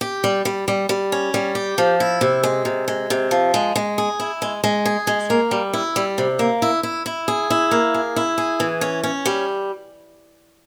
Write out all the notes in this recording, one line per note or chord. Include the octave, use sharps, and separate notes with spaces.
G4
G3
G3
G3
G3
C#4
G3
G4
F3
E4
C3
G#3
C3
G#3
C3
F3
G#3
G#3
G#4
E4
G#3
G#3
G#4
G#3
A#3
G3
E4
G3
C3
A#3
E4
E4
E4
G#4
E4
A#3
G#4
E4
G#4
E3
C#4
C#4
G3